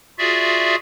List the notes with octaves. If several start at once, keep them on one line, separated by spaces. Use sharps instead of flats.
F4 F#4 G#4 D5 E5